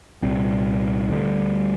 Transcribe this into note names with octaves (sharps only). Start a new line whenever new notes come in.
C2 A#2 G3 C4
D2 D3 G3